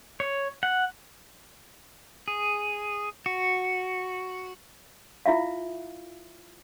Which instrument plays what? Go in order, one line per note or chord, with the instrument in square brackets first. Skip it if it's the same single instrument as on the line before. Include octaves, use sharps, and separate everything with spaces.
[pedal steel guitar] C#5
F#5
G#4
F#4
[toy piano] E4 F4 E5 F5